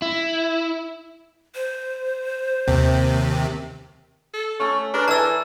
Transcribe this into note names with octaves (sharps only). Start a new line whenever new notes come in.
E4
C5
D#2 C3
A4
A3 C#4 A4
D4 G#4 A#4 B4
E3 A4 D5 G#5 A5 E6